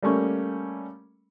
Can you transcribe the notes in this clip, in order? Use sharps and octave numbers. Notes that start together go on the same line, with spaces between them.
G3 A3 A#3 C#4 C#6